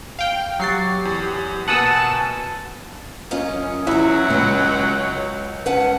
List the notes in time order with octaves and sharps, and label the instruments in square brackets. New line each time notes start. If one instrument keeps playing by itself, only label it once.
[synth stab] F5 G5
[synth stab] F#3 C7 [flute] G4 [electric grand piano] C#6 A6
[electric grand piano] E2
[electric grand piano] B2 A#3 B3 [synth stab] F#5 D#6 E6 [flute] G#5 [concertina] A5
[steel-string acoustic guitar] F#2 F4 D#5 [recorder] C#4
[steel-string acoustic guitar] E2 A#5 [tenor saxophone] F#3 [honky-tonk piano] E4
[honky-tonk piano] C#2 [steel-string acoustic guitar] D#5
[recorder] C#4 [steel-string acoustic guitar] B4 F#5 A5